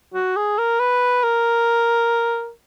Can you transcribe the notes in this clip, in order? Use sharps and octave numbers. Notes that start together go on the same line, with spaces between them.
F#4
G#4
A#4
B4
A#4